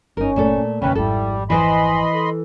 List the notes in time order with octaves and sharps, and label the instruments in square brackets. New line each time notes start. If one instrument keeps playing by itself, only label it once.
[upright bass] G1 F#2 [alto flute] C#4 [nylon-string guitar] D#4 A#4
[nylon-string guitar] A#2 A3 A4
[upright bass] E1 G#2 [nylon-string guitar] D#2 C#3 [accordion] C#4 B4 [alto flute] G5
[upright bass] G#1 F2 [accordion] G3 [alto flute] E4 [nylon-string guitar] A4
[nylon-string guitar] E3 B4 C5 [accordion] D#5 B5 C6 [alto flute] G#5
[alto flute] A4